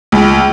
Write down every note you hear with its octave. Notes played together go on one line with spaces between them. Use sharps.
C#2